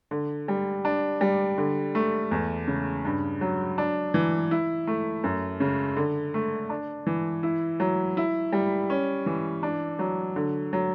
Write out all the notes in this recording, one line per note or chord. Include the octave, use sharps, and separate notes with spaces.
D3
G3
D4
G3
D3
A3
E2
C#3
G2
F#3
D4
E3
E4
A3
F#2
C#3
D3
A3
D4
E3
E4
F#3
E4
G3
C#4
E3
D4
F#3
D3
F#3